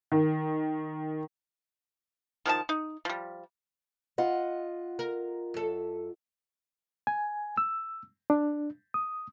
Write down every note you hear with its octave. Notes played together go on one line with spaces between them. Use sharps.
D#3
D#3 F3 E4 A5
D#4
F3 G3
F4 D#5 F#5
A#4
F#2 A4
G#5
E6
D4
D#6